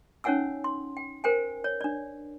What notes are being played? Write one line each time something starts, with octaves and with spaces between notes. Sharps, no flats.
C#4 D#4 C#5 F#5 G#5 E6
C6
G5
A#4 C5 G5 G#5
C#5
D4 D5